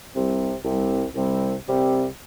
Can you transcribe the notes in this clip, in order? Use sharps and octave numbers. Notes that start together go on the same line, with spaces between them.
C2 C3 G3 C4
C2 C3 G3 C4
C2 C3 G3 C4
C2 C3 G3 C4